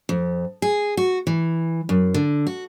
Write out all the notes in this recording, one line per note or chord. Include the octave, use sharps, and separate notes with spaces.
F2
G#4
F#4
E3
F#2
D3
F#4